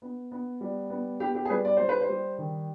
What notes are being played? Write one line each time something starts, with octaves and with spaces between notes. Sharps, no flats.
B3
B3
G3
B3
B3 G4
G4
G#4
G3 B4
D5
G3 C5
B4
C5
G3
D#3